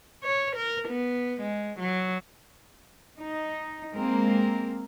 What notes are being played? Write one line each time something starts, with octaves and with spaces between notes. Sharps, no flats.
C#5
A#4
B3
G#3
F#3
D#4
G#3 A#3 C4 A#4